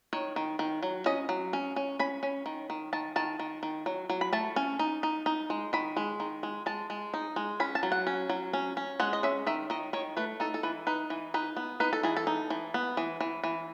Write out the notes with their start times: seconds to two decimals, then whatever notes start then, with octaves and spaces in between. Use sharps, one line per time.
0.13 D#3 C#5
0.36 D#3
0.59 D#3
0.83 F#3
1.06 C#4 D#5
1.29 F#3
1.53 C#4
1.76 C#4
1.99 C#4 B5
2.23 C#4
2.46 D#3
2.70 D#3
2.93 D#3 A5
3.16 D#3 A5
3.40 D#3
3.63 D#3
3.86 F#3
4.10 F#3
4.21 B5
4.33 A3 A5
4.56 C#4
4.79 D#4
5.03 D#4
5.26 D#4
5.50 G#3
5.73 D#3 B5
5.97 G#3
6.20 D#3
6.43 G#3
6.66 G#3 A5
6.90 G#3
7.14 D#4
7.36 G#3
7.60 C#4 B5
7.75 A5
7.83 F#3
7.92 F#5
8.07 C#4
8.30 F#3
8.53 C#4
8.77 C#4
9.00 G#3 F#5
9.13 D#5
9.23 C#4 E5
9.47 D#3 E5
9.70 D#3 D#5
9.93 D#3 C#5
10.17 A3 B4
10.40 D#4 A4
10.54 A4
10.63 E3 B4
10.87 D#4 B4
11.10 E3
11.34 D#4 B4
11.57 B3
11.80 D#4 B4
11.93 A4
12.03 E3 G#4
12.17 A4
12.27 D#4
12.50 E3
12.74 B3
12.97 E3
13.21 E3
13.44 E3